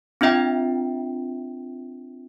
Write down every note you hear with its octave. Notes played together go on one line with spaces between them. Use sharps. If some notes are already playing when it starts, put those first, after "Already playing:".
C4 D4 F4 E5 G5